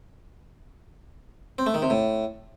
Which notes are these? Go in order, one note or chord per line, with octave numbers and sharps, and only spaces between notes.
C4
A3
D#3
C3
A2